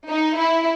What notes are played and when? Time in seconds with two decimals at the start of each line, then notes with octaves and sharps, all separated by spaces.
0.08 D#4
0.38 E4